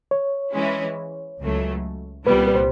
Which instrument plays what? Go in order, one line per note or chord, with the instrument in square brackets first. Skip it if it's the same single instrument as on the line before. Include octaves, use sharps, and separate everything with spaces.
[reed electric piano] C#5
[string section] E3 G#3 C#4 E4
C#2 C#3 F#3 A3
[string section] C2 A#2 G3 B3 [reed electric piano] B4
[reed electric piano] B4
C5